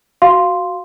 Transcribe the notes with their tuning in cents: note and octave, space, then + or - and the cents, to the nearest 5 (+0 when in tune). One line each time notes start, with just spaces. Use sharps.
F#4 +0 F5 +0 C6 +0